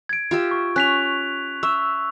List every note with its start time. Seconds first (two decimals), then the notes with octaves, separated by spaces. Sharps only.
0.09 G#6 D7
0.31 F4 G4 E5
0.51 C#6
0.76 C#4 F#6 B6 F7
1.63 E5 C#6 E6